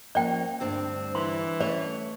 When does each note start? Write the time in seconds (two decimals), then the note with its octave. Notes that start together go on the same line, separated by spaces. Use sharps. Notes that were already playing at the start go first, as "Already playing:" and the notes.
0.15 F3 A#3 C#4 D5 G5
0.60 D2 G2 C4 D4
1.15 E3 C6
1.60 A3 C#4 C#5 D5